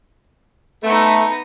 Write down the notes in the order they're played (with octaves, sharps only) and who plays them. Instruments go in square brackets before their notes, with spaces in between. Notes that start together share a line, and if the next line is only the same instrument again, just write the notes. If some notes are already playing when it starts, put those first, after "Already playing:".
[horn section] A3 [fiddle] B3 D#4